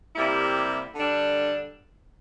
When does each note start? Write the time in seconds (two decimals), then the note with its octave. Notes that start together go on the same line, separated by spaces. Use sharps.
0.15 C3 G3 A#3 E4
0.95 D3 G3 D4